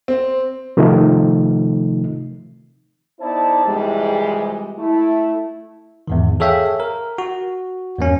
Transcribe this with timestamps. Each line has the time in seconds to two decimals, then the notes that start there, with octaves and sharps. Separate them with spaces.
0.08 C4
0.77 C3 D#3 F3 A3 D#4
3.20 B3 D#4 E4 C5 D5 A5
3.65 C2 F2 G#2 E3 G3 G#3
4.78 A3 E4
6.08 E2 G#2 D#3
6.40 G#4 A4 C#5 E5 F5 G5
6.80 A#4
7.18 F#4
7.98 E2 G2 A#3 C#4